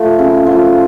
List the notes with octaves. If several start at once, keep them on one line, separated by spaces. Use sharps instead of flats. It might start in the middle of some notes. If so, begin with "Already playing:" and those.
Already playing: F3 A3
C#3
F3